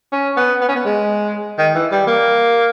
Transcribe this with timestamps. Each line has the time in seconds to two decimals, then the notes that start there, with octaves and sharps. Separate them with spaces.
0.12 C#4
0.37 B3
0.61 B3
0.68 C#4
0.75 B3
0.85 G#3
1.58 D#3
1.75 E3
1.91 G3
2.07 A#3